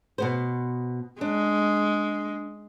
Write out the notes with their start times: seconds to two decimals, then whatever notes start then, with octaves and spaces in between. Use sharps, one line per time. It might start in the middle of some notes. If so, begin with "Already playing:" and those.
0.18 B2 B3 C5
1.21 G#3 D4